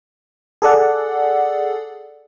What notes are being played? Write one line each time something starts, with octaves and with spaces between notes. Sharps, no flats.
G#4 A4 D5 F#5